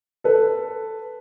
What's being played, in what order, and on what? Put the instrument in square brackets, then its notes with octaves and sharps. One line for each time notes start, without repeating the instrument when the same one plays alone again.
[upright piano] A4 B4